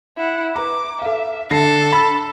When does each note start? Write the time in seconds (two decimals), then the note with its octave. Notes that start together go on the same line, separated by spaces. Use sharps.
0.17 E4 F#5
0.56 B4 A#5 D6
1.02 A4 E5 F5
1.51 D3 D4 A4 A#6 C7
1.93 B5 E6 A6